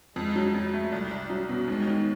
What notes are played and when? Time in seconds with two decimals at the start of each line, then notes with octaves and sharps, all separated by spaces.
0.16 F2 G#3
0.35 F#3
0.54 F2
0.73 A3
0.92 C2 G3
1.11 C2
1.30 F#3
1.49 B2
1.68 D#2 G#3
1.87 D#3